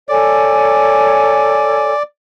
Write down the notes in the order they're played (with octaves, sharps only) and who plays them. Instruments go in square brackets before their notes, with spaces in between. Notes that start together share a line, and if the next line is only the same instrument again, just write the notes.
[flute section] A4 C#5 G#5 [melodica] D5